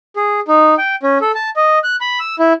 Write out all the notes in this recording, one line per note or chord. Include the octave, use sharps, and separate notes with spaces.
G#4
D#4
G5
C#4
A4
A5
D#5
F#6
B5
E6
E4